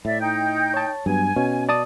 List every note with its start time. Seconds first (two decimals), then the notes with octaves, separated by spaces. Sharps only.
0.05 A2 D5 E5
0.20 D#4 G5 G6
0.74 C#5 A5
1.06 G2 F#3 B3 G#5
1.36 B2 C#4
1.69 D5 A5 D#6